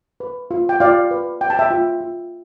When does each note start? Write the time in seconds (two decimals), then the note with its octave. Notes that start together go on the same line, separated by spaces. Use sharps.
0.20 B4
0.51 F4
0.69 G5
0.80 F4 D5 F5
1.11 B4
1.41 B4 G5
1.50 A5
1.59 E5 G5
1.71 F4
2.01 F4